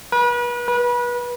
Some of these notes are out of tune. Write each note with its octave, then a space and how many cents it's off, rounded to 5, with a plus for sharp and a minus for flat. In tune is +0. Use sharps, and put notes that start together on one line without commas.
B4 -35
B4 -30